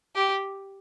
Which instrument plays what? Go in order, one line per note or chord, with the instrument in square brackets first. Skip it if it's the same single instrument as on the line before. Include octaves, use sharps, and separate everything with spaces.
[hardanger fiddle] G4